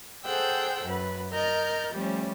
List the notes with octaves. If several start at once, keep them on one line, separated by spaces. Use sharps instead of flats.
G#4 A4 C5 F#5 G5 E6
F#2 B4
A#4 D#5 F6 G6 A6
F3 G3 A3 C#4